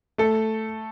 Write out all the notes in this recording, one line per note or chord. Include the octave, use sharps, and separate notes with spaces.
A3 A4